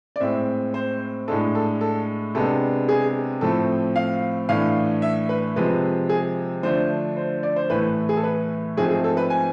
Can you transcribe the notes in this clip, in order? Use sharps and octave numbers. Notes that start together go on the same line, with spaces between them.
D5
A2 G#3 C4 E5
C5
A2 G#3 D4 A4
A4
A4
C3 G#3 B3 D4 A4
G#4
A2 F3 A3 C4 A4
F5
A2 E3 A3 D4 F5
E5
B4
C3 F3 G#3 C4 B4
G#4
D3 F3 A3 D4 C5
C5
D5
C5
A2 E3 A3 B4
G#4
A4
B4
G#2 F3 A3 C4 G#4
G#4
A4
B4
G#5